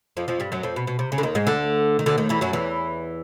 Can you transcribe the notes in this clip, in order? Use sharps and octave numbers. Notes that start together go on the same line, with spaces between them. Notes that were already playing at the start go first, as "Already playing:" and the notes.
F2 F3
F2 F3
G2 G3
F#2 F#3
F2 F3
B2
B2
C3
C#3
D3
D#2 D#3
G#2 G#3
D2 D3
D#3
D2 D3
D#2 D#3
E2 E3
F#2 F#3
E2 E3